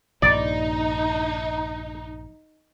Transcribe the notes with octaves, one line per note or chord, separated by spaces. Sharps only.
A#1 G2 C3 D#4 D5